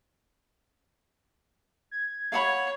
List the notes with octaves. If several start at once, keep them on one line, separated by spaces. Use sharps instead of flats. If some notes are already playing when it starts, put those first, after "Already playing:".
G#6
C#5 F5 F#5 B5